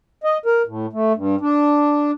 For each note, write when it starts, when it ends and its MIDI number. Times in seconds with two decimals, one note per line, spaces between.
0.24 0.38 75
0.46 0.62 70
0.67 0.86 45
0.93 1.13 57
1.16 1.36 43
1.41 2.11 62